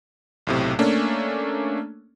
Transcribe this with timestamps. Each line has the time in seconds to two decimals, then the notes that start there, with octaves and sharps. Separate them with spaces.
0.47 B1 A2 C3
0.79 A3 A#3 C#4 D4